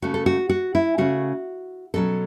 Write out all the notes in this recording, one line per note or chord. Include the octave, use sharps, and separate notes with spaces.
C#3 A3 C#4 F#4
A4
F#4
F#4
E4
C#3 A3 C#4 F#4
B2 F#3 C#4 A4